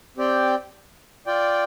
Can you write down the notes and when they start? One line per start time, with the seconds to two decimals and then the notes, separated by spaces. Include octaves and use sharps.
0.17 C4 G4 D5 G5
1.26 F4 D5 G5